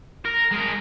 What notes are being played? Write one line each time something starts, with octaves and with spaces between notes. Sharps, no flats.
A#4
G#3 A#4